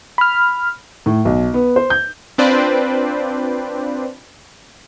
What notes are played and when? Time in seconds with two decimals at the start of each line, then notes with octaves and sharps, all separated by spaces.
0.18 B5 F6
1.06 A2
1.25 B1
1.54 B3
1.76 C5
1.90 G6
2.38 C4 D4 F4 B4 C5 D5